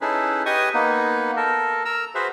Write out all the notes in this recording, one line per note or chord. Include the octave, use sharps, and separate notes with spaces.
C#4 D#4 E4 G#4 A4 B4
G4 B4 D#5 G#5 C#6 D#6
A#3 B3 D#4
A4 A#4
A#4 A#5 E6
F#4 G#4 B4 C5 E5